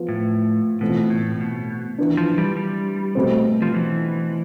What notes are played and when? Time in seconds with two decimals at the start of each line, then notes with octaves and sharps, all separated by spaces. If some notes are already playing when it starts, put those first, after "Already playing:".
Already playing: F3 B3 F4
0.09 A2
0.81 B2 E3 A3 C4 F4
1.10 A2
1.40 B2
1.98 E3 B3 D4
2.17 F3
2.38 G3
2.57 G3
3.15 B2 A3 C4
3.62 F3
3.74 E3